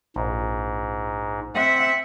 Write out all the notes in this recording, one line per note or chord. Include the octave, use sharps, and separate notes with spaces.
A#1 G#2
C4 E5 F#5